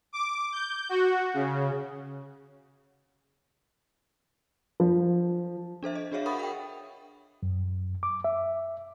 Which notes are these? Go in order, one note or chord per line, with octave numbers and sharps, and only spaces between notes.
D6
G6
F#4
C#3
F3
D4 A4 C5 E5
D#5
D4 F#4 G#4 C#5 E5 F5
A#4 F#5 B5 C#6 D#6
F#5 G5
F#2
D6
E5